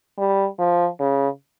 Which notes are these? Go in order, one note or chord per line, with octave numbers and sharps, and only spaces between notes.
G3
F3
C#3